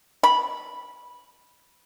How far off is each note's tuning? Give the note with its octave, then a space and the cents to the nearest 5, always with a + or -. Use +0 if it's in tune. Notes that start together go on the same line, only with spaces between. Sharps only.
B5 -15